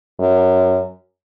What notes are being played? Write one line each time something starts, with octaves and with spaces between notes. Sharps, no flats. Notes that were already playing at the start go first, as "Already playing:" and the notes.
F#2